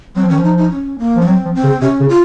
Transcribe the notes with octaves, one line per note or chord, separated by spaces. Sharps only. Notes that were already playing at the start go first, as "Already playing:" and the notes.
F#3 C4
F3
D#3 C#4
F3
D#4
D#4
C#4
A#3
F3
C#4
F#3 C4
F3
C4
C#3
C3 C#4
C#3
F4